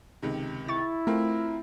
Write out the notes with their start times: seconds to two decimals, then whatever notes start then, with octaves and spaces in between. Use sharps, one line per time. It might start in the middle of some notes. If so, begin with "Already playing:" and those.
0.22 C#2 C3 D#3
0.68 E4 C#6 A6
1.07 A3 C4 F4 A#4